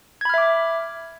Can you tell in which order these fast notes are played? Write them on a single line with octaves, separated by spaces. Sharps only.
G#6 B5 F6 E5 D6